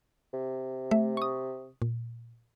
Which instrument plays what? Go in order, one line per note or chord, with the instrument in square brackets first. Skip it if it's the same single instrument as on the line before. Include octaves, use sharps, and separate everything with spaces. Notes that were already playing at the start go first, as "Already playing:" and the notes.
[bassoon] C3
[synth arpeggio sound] A3 E5
C#6 D#6
A#2